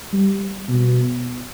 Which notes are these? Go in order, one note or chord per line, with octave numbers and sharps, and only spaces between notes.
G3
B2